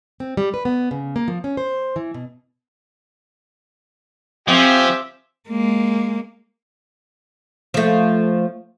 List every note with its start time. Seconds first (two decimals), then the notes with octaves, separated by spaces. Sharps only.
0.20 C4
0.37 G3
0.54 B4
0.65 B3
0.91 C#3
1.16 A#3
1.28 F3
1.44 C#4
1.57 C5
1.96 E3
2.14 B2
4.48 F3 C4 G4 E5 G#5
5.49 G#3 A#3
7.74 F3 A3